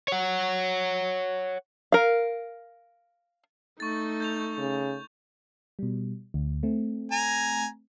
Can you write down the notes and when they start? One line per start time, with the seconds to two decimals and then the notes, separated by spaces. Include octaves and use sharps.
0.08 C#5 F#5
1.92 A#4 F5
3.80 A3 D#4 C#6 A6
4.20 G6 A6 F7
4.58 C#3
5.79 B2 G3
6.34 D2
6.63 A3 C4
7.12 G#5 A#5